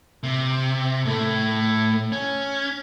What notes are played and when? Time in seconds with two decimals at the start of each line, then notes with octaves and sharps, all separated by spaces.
0.23 C3
1.05 A2 A3
2.12 C#4